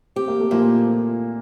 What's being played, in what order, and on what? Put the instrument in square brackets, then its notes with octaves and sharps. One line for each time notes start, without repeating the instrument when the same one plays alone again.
[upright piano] C4 [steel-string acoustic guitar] G4
[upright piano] A#3
A3
[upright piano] A#2 A#3 [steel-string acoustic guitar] F3